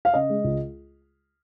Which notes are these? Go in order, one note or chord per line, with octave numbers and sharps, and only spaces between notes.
F5
C#3 D#5
G#3
C#2